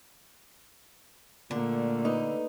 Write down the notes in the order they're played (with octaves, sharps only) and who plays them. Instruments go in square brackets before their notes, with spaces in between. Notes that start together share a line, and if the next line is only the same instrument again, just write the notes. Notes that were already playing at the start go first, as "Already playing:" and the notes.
[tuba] A#2 [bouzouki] D3 [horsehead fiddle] A3 A#3
[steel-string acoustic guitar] D#4 B4